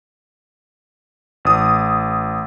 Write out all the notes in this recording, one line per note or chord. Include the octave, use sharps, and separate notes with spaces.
A1 D#6